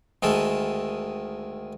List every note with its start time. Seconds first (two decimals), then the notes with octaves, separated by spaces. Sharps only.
0.23 D2 D#3 G#3 A4